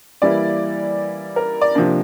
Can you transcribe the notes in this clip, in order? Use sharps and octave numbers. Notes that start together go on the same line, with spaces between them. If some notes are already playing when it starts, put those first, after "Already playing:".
E3 G3 A#3 E4 D5
A#4
D5
C3 F3 A#3 D4